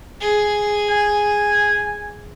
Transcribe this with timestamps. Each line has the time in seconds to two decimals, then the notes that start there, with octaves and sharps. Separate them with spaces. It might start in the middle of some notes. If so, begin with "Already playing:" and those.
0.21 G#4
0.90 G#5